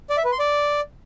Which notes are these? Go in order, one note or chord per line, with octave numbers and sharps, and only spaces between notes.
D5
E5
B4
C6
D5